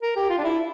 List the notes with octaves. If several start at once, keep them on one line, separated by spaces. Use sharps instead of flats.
A#4
G4
F4
D4
E4